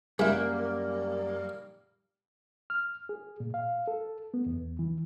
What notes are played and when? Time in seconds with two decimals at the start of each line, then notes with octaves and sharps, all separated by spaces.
0.19 F#2 G3 G#3 A#3 E4
2.70 F6
3.09 G#4
3.40 A#2
3.54 F5
3.88 A4
4.34 B3
4.46 E2
4.79 E3